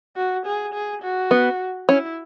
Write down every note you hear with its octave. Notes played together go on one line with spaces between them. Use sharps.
F#4
G#4
G#4
F#4
B3
C#4 E4